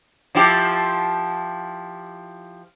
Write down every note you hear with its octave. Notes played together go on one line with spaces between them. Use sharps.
F3 E4 G4